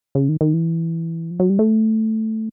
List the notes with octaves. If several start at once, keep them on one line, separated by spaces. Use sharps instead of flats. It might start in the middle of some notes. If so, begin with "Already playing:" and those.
C#3
D#3
D#3
E3
F3
F#3
G3
A3